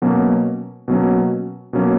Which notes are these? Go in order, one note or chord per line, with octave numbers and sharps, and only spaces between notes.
B2 F#3 A#3 C#4
B2 F#3 A#3 C#4
B2 F#3 A#3 C#4